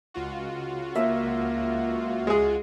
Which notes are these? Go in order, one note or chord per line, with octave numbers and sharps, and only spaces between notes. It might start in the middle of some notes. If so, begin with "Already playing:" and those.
C#2 F4 F#4
A#3 E5
G#3 G#4